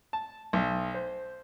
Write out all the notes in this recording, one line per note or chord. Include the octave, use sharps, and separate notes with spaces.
A5
B1
C5